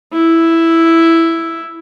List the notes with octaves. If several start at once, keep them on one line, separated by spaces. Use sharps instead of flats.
E4